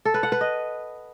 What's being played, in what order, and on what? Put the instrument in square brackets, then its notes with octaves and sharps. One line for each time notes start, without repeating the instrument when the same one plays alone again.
[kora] A4
B4
F#5
B4
D#5